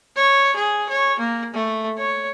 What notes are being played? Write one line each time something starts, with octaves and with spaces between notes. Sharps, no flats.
C#5
G#4
C#5
A#3
A3
C#5